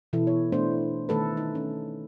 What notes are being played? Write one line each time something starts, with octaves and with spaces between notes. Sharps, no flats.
B2 E3 E4 A4
C#5
A3 B3 D4 E4 C5
D#3 A3 A4 B4
D#4
C#4